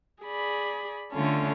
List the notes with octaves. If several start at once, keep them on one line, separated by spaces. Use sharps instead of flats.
G#4 D5 B5
D3 A3 C#4 F4 A4